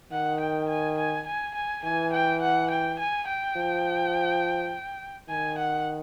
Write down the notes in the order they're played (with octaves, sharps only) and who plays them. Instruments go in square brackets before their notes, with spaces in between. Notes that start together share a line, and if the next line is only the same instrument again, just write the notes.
[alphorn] D#3 [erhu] F#5
[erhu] G5
G#5
G#5
G#5
G#5
[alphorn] E3 [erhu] G#5
[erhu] G5
F#5
G5
G#5
G5
[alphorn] F3
[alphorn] D#3 [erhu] G#5
[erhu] F#5